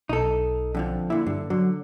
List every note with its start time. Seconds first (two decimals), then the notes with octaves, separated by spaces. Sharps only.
0.09 B1 D#4 A4
0.75 F2 D3 F3
1.10 A#2 D3 E4
1.27 G2 D3
1.50 D3 F#3